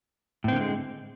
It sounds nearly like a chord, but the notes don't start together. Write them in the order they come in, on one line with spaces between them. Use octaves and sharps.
A2 C4 D3 A#3 G#3